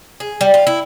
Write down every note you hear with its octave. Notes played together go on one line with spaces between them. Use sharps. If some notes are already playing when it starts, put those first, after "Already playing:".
G#4
G3
F4
E4